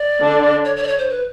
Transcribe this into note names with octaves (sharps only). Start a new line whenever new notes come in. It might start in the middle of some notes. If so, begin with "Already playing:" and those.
Already playing: D5
D3 D4
C#5
C#5
D5
C#5
C5
B4